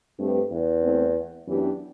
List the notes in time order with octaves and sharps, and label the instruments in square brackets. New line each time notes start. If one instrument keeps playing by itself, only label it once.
[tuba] G2 [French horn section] A3 C4 G4 B4
[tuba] E2
[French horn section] A3 C4 E4
[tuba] F#2 [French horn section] E3 B3 D4 G4